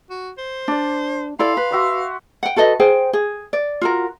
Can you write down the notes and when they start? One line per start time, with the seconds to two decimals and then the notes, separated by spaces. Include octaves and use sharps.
0.10 F#4
0.38 C5
0.68 D4 D5
1.39 E4 A4 D5 F5 C6
1.57 B4
1.71 F#4 E5 C6
2.43 F#5 G5
2.56 F#4 A4 B4 D#5
2.80 G#4 C5 G5
3.13 G#4
3.53 D5
3.81 F4 F#4 A#4